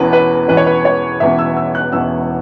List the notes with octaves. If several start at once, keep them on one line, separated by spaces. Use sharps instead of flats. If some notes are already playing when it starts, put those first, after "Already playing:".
Already playing: E1 E2 E3 C#4 B4
B4
E1 E2 E3 C#4 B4
C#5
B4
C#5
E1 E2 E3 C#4 E5
E6
E6
F#6
E1 E2 E3 C#4 E6